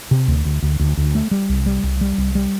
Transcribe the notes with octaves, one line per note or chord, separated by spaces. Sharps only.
C3
D2
D2
D2
D2
D2
A3
G3
C2
G3
C2
G3
C2
G3